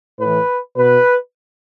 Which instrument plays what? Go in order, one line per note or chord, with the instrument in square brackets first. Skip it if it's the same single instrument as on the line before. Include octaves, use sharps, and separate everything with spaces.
[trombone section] A2 E3 B4
B2 B4